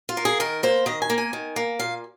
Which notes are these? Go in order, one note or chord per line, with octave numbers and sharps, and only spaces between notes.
F4
A#3
G#4
D#3 A#4
A#3 C5
D#3 D#5
G#5
A#3
G#5
D#3
A#3
A#2 F5